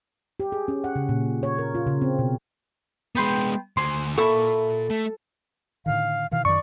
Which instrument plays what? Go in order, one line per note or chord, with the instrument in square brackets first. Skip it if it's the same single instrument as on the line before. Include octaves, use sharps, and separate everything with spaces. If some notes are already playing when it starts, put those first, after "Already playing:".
[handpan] G4
G#4
C#4
F#5
C#3
A#2
C#5
A#4
F4
C#3
C4
B2
[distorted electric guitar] G#3 B3 [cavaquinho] B4 G5 C6
[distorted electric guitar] D2 C5 [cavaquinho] G#5 C6
[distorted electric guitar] A#2 [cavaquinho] E4 E5 C#6 [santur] A4
[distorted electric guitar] A3
[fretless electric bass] A2 D3 D#3 [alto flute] F5
[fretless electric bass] B2 D#3 E3 [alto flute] F5
[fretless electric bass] F#2 D#3 [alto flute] D5 [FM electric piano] C#6